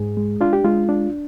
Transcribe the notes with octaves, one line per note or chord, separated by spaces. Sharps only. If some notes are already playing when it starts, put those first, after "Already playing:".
Already playing: G#2 G#4
G#3
D4 F4
G4
G#3 F4
D4